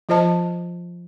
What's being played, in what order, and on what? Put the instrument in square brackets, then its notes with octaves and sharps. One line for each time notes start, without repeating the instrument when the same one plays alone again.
[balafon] F3 F4 C5 D#5 A5